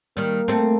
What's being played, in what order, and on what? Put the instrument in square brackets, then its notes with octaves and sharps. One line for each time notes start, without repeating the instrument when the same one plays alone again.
[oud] D#3 G3 [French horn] A#3
[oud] A3 C4